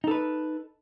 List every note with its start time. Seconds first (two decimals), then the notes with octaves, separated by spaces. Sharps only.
0.04 D#4
0.08 A4
0.11 B4